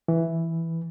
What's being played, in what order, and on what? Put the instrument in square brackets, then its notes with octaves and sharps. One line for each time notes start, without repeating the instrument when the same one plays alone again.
[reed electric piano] E3